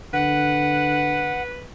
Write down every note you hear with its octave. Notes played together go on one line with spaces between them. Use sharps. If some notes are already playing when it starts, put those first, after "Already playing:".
D3 B4 F#5